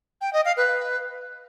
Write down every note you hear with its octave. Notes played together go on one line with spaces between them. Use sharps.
G5
D#5
F5
B4